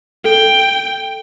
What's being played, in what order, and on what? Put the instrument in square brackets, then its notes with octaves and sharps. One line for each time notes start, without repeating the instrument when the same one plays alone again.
[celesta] A4 [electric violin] G5